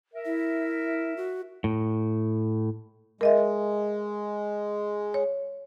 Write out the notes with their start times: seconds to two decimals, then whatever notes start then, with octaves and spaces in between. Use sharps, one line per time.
0.13 A#4 E5
0.25 E4
1.17 F#4
1.64 A2
3.21 G#3 A#4 D#5 E5
5.14 C#5